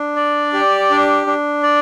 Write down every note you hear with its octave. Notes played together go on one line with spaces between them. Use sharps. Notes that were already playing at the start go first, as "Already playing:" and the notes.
Already playing: D4
D5
G4
D4
D4
D5